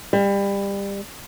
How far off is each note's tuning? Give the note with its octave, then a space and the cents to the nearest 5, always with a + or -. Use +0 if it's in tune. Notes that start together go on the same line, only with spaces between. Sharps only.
G3 +25